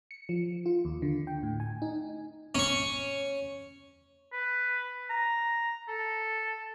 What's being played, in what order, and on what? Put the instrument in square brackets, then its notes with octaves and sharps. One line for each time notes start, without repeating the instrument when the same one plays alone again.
[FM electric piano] C#7
F3
F4
D#2
D3
G5
A2
G#5
D#4
[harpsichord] C#4 C#6
[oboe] B4
A#5
A4